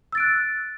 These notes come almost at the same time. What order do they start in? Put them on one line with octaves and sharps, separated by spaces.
E6 A6 D7 F#6